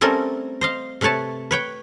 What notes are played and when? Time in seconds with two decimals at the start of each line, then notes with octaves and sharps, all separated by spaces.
0.01 G3 A3 C4 C#4 A4 A#4
0.61 C5 D#5 F5
1.01 C3 A3 B4 C#5 A5
1.51 B4 C#5 G5